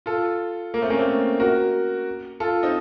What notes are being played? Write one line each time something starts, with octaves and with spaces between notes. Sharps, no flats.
F4 A4
A#3
A3 C4
A#3 C#4
A3 C4
F#4 A#4
F4 A4
C4 D#4